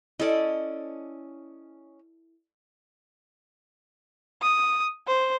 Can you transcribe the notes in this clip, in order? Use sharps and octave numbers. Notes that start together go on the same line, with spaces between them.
C#4 E4 A4 D5 D#5
D#6
C5